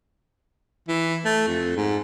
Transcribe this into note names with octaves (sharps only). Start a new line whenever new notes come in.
E3
A3
F2
G#2